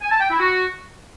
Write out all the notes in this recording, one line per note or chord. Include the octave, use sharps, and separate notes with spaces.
G#5
A5
G5
E4
F#4